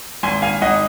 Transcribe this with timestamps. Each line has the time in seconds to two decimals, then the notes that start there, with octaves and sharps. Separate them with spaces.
0.23 G#1 G#5 C6
0.42 G#1 F5 G#5
0.62 G#1 D#5 F#5